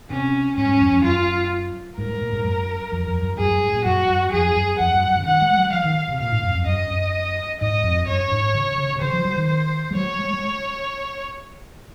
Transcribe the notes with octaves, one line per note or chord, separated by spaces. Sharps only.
C3 C#4
G#2 C#4
G#2
F#2
F2
F#2 F4
G#2 A#4
G#2
A#2
G#2
F#2
F2
F2
F#2
F#2 G#4
F#2
G#2
A#2
F#2 F#4
F#2
F2 G#4
F#2
F2 F#5
F#2
F#2
C#3
D#3 F#5
G#3
F#3
F3 F5
D#3
C3
A#2 F5
G#2
F#2
F2
F#2 D#5
F#2
G#2 D#5
F2
F#2 C#5
G#2
C#3
C#3
C3
C#3 C5
F3
F#3
D#3
C5
G#3
F#3 C#5
G#3
G#3